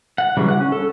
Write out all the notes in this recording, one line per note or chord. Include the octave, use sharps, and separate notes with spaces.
F#5
C#3 E3 F#3 G3
F#5 F#6
C#4
A4